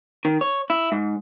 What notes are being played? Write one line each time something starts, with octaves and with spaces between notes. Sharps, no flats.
D#3
C#5
E4
G#2